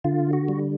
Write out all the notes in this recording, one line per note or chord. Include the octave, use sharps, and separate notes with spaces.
D3 F4
F#4
G3